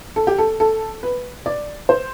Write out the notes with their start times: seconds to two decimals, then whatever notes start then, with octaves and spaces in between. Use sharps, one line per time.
0.16 A4
0.27 G4
0.38 A4
0.60 A4
1.03 B4
1.46 D5
1.89 C5